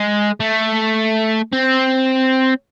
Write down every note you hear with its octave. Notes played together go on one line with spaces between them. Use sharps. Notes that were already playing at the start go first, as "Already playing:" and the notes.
Already playing: G#3
A3
C4